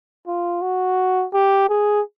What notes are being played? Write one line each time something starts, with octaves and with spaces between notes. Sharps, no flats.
F4
F#4
G4
G#4